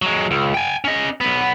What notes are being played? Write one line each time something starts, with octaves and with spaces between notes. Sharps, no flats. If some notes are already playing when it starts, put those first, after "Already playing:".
F#3 G#3
C#2
G5 G#5
C#4 D#5
B1 B3